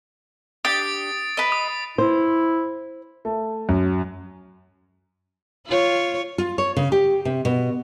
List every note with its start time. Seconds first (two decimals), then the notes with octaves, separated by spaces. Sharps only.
0.65 D4 G4 D#6 A6 D7
1.37 B4 D#5
1.52 D#6
1.98 E4 C5
3.25 A3
3.69 F#2
5.67 F4 C#5
6.38 F4
6.58 C#5
6.77 C#3
6.92 G4
7.25 C3
7.45 B2